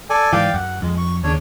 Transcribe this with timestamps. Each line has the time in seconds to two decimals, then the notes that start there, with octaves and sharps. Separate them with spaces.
0.10 A4 D5 G#5
0.33 G#2 E3 D5 F5 G5
0.54 F#2 F#5
0.82 F2 G#3
0.98 C#6
1.24 D#2 C#3 D4 C#5